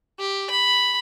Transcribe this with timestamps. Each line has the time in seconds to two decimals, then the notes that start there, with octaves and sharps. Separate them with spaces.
0.19 G4
0.50 B5